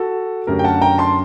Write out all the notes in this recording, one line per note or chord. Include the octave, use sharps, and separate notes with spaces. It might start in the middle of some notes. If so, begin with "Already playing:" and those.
Already playing: F#4 A4
F#2 D3 A3 G4 A#4
G5
F#5 A5
G5 A#5
A5 C6